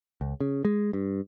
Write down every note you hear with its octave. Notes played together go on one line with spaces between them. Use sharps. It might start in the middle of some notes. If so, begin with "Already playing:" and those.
C#2
C#3
G#3
G2